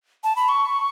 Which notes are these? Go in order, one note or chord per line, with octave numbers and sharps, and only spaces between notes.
A5
B5
C#6